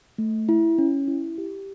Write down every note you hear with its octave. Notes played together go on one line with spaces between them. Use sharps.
A3
E4
C#4
E4
G4